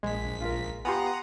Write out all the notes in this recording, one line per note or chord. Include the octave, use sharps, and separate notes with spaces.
A#1 G#3 B6
F4 A#4
B3 F4 G4 F#5 G#5 A#5 C6 D#6